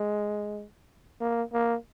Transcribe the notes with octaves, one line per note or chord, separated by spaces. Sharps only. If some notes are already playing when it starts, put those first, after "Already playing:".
Already playing: G#3
A#3
A#3